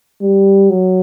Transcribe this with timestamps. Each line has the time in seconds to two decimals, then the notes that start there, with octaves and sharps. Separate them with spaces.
0.22 G3
0.70 F#3